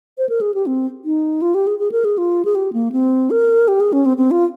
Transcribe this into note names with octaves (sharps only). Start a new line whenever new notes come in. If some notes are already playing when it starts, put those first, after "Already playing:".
C5
A#4
G#4
G4
C4
D#4
F4
G4
G#4
G#4
A#4
G#4
F4
G#4
G4
A#3
C4
A#4
G4
G#4
C#4
C4
C4
F4